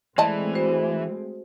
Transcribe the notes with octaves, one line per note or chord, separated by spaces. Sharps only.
E3 G#3 A3 C4 D5 D#5 A5
F#4 C5